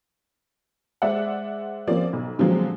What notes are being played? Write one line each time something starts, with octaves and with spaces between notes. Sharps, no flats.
G#3 C5 D5 E5 F#5
F3 A#3 C4 C#4 F4 D5
B1
A#2 D3 F3 F#3 G#3 C4